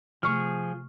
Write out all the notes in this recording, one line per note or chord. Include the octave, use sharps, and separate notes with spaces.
C3 F3 A3 G#4 C#6 F6